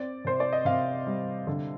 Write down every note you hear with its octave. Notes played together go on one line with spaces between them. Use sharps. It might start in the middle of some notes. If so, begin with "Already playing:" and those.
Already playing: C4 D5
C3 C5
D5
D#5
C3 F5
G3
D3